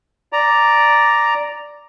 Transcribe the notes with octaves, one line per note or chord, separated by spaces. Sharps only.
D5 A#5